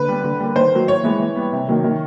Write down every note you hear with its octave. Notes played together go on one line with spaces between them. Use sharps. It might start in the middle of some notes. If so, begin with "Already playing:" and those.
Already playing: D3 B4
G3 B3
D3
G3 A#3
D#3 C5
F#3 A#3
A2 C#5
E3 G#3 B3
E3
G3 B3
C3
D#3 F#3 A#3
D#3